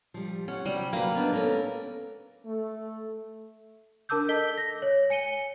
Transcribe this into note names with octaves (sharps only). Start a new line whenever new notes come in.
F3 G3
C#4 F#5
C3 F#3 G3
F#3 A#3 B4
B3 D4 D#4
C#4 A4 A#4
A3
D4 A#4 A5 D6 E6 G6
A4 D#5 B6 G7
A#6
C#5
G#5 C#7 D#7 G7